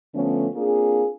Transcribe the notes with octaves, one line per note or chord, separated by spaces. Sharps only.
D3 F3 A3 B3 C#4
A#3 C4 D4 F4 G#4